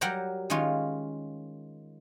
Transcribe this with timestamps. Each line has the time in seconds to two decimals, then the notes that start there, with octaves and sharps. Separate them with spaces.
0.01 F#3 G3 A#4 F#5 G5 A#5
0.50 D#3 G#3 C#4 F4